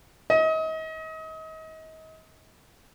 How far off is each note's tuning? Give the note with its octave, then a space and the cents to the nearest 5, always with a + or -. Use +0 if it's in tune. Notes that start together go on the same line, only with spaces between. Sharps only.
D#5 +35